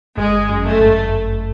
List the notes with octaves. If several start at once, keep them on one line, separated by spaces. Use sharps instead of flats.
G1 G#3
F#2
A3
G1